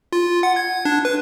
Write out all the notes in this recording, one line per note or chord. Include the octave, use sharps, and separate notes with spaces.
F4
F#5
G#6
D4
B4